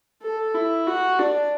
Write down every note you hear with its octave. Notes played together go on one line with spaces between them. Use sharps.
A4
E4
F#4
D4